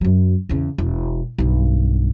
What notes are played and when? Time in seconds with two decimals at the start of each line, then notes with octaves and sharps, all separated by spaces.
0.01 F#2 F#3
0.49 E2 C#3
0.78 E1
1.38 B1 G2